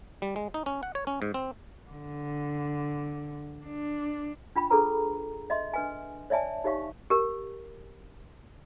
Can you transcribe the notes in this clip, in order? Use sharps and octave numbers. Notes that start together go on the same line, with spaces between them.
G3
G#3
D#4
C#4
F#5
C#5
C#4
G#2
C4
D3
D4
D4 F4 G5 B5
D4 G#4 A4 B4 A#5
D#5 E5 C6
D4 B4 G#5
C#5 D5 E5 G#5 A5
D#4 G4 C#5 E5 F5 C#6
G4 A#4